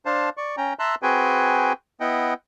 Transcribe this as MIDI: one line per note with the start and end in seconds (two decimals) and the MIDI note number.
0.06 0.30 62
0.06 0.30 72
0.06 0.30 77
0.06 0.30 81
0.37 0.56 74
0.37 0.56 85
0.57 0.74 61
0.57 0.74 79
0.57 0.74 82
0.79 0.95 76
0.79 0.95 81
0.79 0.95 82
0.79 0.95 84
0.79 0.95 88
0.79 0.95 90
1.02 1.73 60
1.02 1.73 66
1.02 1.73 68
1.02 1.73 71
1.02 1.73 79
1.02 1.73 80
2.00 2.34 59
2.00 2.34 64
2.00 2.34 75
2.00 2.34 78
2.00 2.34 79